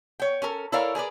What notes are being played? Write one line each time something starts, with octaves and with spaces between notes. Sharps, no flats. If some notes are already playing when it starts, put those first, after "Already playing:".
C#5 G5
C#4 A4 A#4
E4 A4 A#4 C#5 D5 F5
G#4 A#4 B4 D5